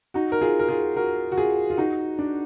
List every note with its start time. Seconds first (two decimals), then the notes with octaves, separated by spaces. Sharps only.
0.14 D#4 F#4
0.32 A#4
0.41 F4 G#4
0.59 A#4
0.69 F4 G#4
0.96 F#4 A#4
1.32 F#4
1.38 F4 G#4
1.70 F4
1.77 D#4 F#4
2.19 D4